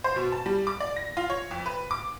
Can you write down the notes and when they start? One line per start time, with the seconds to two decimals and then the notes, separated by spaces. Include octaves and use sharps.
0.04 C5
0.16 B2
0.32 A5
0.46 G3
0.67 D6
0.80 D5
0.97 A#6
1.17 F4
1.30 C#5
1.51 F2
1.66 B4
1.91 D6